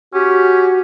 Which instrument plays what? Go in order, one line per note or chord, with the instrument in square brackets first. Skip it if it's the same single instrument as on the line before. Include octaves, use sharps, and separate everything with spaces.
[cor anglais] C#4 [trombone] F#4 [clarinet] G4